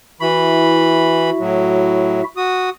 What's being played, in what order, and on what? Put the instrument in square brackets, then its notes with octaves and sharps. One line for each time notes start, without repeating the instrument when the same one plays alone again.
[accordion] E3 B5 [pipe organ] E4 F#4 E5
[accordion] A2 F#3
F#4 D#6